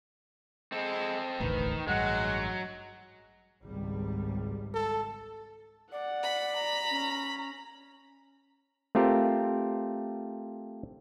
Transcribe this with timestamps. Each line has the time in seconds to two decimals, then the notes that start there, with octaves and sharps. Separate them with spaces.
0.72 G#3 C4 A4
1.40 E1 A1 D2 D#3 B4
1.88 A1 G2 F#3 G#3 F#5
3.65 G#1 C#2 G3
4.74 A4
5.92 D5 F#5
6.23 B5
6.58 A#5
6.90 C#4
8.95 A3 C4 F4 G4 A#4